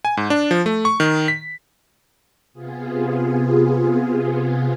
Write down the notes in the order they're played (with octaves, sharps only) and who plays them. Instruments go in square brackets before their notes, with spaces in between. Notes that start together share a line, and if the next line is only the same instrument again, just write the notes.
[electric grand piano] G#5
G#2
D4
F3
A3
C#6
D#3
B6
[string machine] C3 B3 F4 G#4